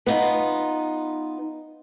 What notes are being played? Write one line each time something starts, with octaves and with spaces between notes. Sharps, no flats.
B3 D#4 F4